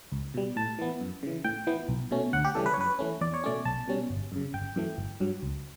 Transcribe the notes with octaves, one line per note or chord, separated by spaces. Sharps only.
C#2
B2 G3
A2 A5
E3 B3
F#2
C#3 E3
A2 G5
E3 B3
B1
B2 A3 C#4
D2 F#5
G4
C#3 E3 G3 C#4 A4
B4
C#5
F#2 B4
E3 A3 C#4
E2 D5
C#5
B2 A3 C#4 D5
B1 A5
B2 G3 C#4
G1
F#2 C#3
G1 G5
F#2 E3 A3
G1
G2 F#3
C#2